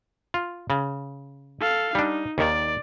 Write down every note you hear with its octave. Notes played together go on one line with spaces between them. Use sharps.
F4
C#3
A4 F5
G3 D4 D#4
D#2 D#3 D5